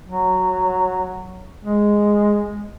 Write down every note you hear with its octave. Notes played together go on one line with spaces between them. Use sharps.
F#3
G#3